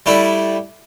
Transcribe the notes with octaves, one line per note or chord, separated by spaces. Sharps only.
G3 A3 D4 E4